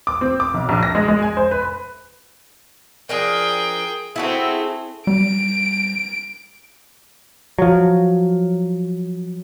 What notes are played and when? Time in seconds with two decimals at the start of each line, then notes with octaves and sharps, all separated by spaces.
0.07 D6
0.21 C4
0.40 D6
0.54 B1
0.69 A#1
0.83 A#6
0.95 G#3
1.08 G#3
1.23 G#5
1.37 C5
1.51 B4
3.09 F3 D4 G#4 A#4 G5
4.16 A3 C4 E4 F#4 G#4
5.07 G3 D7
7.59 F3 F#3